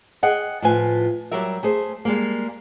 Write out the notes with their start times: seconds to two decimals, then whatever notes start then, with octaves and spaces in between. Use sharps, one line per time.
0.23 G#4 D#5 F#5 G5
0.62 A2 F3 F4 B4 G#5
1.31 F#3 G3 G4 A#4 E5
1.63 A3 G#4 C5
2.05 G3 G#3 A#3